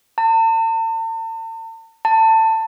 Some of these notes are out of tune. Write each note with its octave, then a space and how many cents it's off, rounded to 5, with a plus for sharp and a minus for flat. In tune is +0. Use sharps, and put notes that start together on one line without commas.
A5 +45
A5 +20